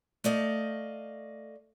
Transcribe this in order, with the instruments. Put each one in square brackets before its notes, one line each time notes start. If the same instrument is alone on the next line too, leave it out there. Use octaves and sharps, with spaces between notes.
[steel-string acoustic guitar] A3 D5 D#5 F5